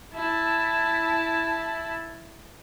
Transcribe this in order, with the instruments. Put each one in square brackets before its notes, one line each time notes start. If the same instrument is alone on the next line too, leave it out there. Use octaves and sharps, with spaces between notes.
[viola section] E4 A5